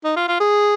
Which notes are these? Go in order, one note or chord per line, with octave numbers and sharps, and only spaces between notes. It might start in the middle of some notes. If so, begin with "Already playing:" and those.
D#4
F4
F4
G#4